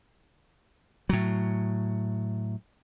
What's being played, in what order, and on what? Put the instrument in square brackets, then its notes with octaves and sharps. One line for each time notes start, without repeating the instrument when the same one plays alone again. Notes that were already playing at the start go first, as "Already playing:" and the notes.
[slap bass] A2 F#3